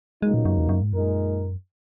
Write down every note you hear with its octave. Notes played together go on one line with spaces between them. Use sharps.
C#2 B2 F#3 G#3 A#3 D#4
A#2
F#2
E2
F#2
G#2
F#2 A#2 G#3 D#4 A#4